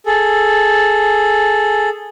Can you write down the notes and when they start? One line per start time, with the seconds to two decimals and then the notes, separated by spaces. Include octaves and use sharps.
0.06 G#4 A4